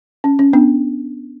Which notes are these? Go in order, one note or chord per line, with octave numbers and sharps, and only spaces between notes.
C#4
C#4
B3 D4